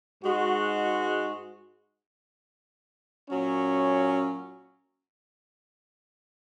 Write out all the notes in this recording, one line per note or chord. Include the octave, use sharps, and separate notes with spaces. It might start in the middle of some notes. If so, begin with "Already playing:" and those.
G#2 G#3 F#4
A#2 F#3 C#4